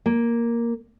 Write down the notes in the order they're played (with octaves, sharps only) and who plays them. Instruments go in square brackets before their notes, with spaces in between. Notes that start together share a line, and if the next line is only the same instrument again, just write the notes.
[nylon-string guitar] A#3